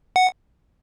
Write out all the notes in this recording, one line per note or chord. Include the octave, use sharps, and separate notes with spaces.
F#5